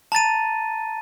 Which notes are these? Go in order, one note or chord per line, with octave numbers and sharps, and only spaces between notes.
A5 A#5 A6 D#7